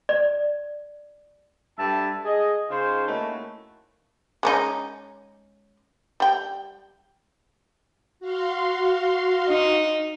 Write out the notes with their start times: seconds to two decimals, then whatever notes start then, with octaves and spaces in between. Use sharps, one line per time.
0.09 D5
1.79 G2 A4 E5 A5
2.25 G#4 D#5
2.70 C#3 D#4 F4 C5
3.07 A3 A#3 C#4 D#4 E4 F#4
4.43 G#3 C#4 D#4
6.20 G3 G5
8.20 F#4 F5 C6
9.48 D#4